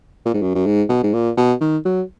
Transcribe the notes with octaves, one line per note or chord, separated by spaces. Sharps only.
A#2
G#2
F#2
F#2
G#2
B2
G#2
A#2
B2
D#3
F#3